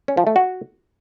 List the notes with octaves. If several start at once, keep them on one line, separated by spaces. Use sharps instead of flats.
C#4
F3
A3
F#4